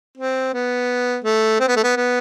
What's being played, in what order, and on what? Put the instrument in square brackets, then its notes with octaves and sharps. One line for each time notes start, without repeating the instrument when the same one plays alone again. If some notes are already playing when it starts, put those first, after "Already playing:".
[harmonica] C4
B3
A3
C4
B3
A3
B3
B3